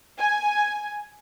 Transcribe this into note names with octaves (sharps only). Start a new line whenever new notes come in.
G#5